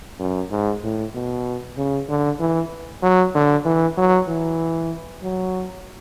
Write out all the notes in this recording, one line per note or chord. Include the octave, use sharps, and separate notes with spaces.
F#2
G#2
A2
B2
C#3
D3
E3
F#3
D3
E3
F#3
E3
F#3